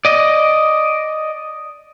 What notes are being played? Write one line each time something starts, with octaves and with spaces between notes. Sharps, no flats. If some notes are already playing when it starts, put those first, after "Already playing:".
D5 D#5